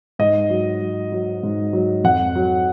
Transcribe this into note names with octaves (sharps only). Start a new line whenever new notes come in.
G#2 D#5
F#3
F#3
F#3
G#2
F#3
F2 F#5
F#3